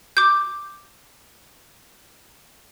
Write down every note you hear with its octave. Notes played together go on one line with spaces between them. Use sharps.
D6 G6